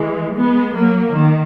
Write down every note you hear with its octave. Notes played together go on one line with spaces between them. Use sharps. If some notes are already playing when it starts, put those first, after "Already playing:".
Already playing: E3 G#3
G#3 B3
F#3 A#3
D#3